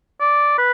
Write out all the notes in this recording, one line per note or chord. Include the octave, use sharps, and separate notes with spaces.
D5
B4